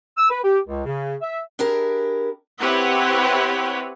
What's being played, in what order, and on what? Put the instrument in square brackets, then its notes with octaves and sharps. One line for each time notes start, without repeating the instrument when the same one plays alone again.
[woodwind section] E6
B4
G4
C#2
C#3
E5
[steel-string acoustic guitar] D4 E4 G4 G#4 A#4
[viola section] C4 E4 G4 B4 C#5 F#5